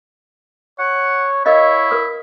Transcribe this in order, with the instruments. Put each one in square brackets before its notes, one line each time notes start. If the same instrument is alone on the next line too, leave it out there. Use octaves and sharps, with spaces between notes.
[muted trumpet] C#5 [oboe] F#5
[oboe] E4 [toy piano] A#4 D#5 F5 [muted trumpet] C#5
[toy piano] A#4 B4 D#6